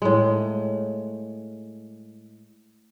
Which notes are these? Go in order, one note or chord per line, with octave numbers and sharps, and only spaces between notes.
A2 G#3